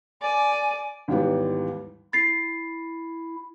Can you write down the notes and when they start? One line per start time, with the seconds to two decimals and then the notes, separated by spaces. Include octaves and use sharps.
0.22 D5 G#5
1.08 D#2 G#2 D#3 E3 G3 B3
2.13 E4 A6 C7